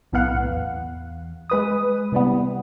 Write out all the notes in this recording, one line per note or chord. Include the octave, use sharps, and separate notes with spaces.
B1 A2 B3 F5 F#5
E2
G#3 B4 D#6
C3 E3 G3 B3